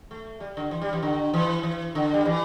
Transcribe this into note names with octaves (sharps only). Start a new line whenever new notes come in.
A3
G3
D3
E3
G3
E3
D3
E3
E3
D3
G3
E3